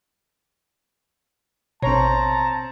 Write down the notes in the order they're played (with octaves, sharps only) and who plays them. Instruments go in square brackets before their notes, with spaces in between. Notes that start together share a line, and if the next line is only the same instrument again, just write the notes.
[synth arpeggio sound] A1 B2 [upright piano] C4 C#5 [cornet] A5 [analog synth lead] A#5